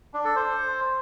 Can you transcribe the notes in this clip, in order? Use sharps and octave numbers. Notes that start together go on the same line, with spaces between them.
D4
A4
C5